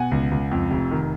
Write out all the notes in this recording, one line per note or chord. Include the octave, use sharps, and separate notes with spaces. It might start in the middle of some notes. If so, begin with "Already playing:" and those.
Already playing: B2 F#5 G#5
C#2
C#2
F2
F1
D#3